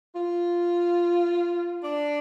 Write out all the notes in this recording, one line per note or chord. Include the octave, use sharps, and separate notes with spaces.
F4
D4